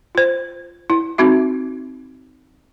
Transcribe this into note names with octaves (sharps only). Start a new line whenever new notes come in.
F4 C5
E4
C4 D#4 F#4 E5